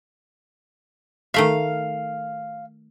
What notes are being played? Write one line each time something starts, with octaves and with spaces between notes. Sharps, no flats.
D#3 A3 E5 F5